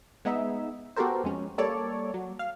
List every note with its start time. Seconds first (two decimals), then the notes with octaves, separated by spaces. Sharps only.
0.25 G#3 B3 D#4 E5
0.96 B3 F#4 G4 A4 A#4 C5
1.23 F2 G#3 C#4
1.58 G3 A#3 A4 C#5 D5
2.14 F#3
2.39 F5